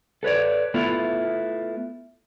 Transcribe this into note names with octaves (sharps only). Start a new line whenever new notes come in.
A4 B4 C#5 D5
A3 B3 E4 F4